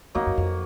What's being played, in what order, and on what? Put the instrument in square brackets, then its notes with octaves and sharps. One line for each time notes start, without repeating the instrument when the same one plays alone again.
[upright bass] F2 [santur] F#3 A#3 D#4
[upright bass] F#2
F2